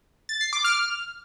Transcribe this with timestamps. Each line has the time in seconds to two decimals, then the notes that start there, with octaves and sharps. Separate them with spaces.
0.29 A6
0.41 C7
0.53 D6
0.64 F6